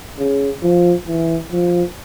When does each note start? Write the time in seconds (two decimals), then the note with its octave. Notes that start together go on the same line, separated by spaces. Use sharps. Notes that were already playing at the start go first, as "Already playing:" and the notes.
0.18 C#3
0.63 F3
1.07 E3
1.52 F3